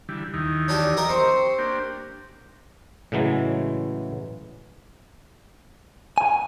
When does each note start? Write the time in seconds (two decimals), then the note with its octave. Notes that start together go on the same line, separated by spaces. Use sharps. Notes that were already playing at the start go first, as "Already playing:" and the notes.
0.09 D3 E3 G3
0.34 D#2 D#3 E3
0.68 C#4 D4 G4
0.97 G4 A#4 D#5
1.09 C4 C5 C#6
1.58 A#3 D4 G4
3.12 A2 C#3 E3 F#3 G#3
6.18 G#5